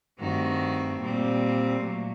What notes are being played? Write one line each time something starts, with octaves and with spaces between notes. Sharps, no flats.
G2 D#3 A3 C4 F#4
A#2 G3 C4
A#2 F#3 A3